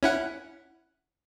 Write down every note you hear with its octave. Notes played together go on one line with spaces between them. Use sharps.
C#4 E4 F#5